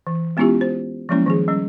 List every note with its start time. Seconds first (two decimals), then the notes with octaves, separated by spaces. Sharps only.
0.07 E3
0.37 G#3 B3 C#4 E4 F4 G4
0.61 C5
1.09 F3 F#3 G#3 A#3 C#4 E4
1.26 D#3 F3 G#4
1.48 G3 C#4